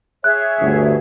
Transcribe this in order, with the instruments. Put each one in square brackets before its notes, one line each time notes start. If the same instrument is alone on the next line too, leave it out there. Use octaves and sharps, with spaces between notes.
[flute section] G#4 C#5 E5 [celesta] F#6
[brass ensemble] G1 D2